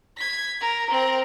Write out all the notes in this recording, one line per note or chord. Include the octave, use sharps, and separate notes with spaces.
G#6 B6
A#4
C4 A#4